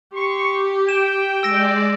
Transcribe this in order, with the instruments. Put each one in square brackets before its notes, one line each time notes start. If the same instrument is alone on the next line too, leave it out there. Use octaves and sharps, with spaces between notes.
[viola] G4 [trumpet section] C6 C#6
[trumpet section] G5 [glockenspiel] E7
[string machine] G#3 D5 [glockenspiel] E6 A#6 D7